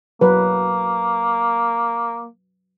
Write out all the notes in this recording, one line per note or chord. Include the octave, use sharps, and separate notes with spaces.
F#3 A#3 B4